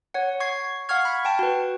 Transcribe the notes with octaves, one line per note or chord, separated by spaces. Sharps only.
C#5 F#5
C#6 G#6 C7
F5 F#5 C#6 F6 G#6
B5
G5 A5
F#4 B4